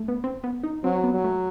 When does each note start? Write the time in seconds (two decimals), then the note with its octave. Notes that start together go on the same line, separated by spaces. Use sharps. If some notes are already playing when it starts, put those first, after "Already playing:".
Already playing: A3
0.08 B3
0.24 C4
0.44 B3
0.63 D#4
0.84 F#3 C4
1.04 B3
1.14 F#3
1.24 A3